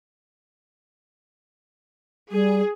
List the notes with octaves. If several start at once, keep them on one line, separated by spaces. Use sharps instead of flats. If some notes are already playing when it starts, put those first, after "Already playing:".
G3 G#4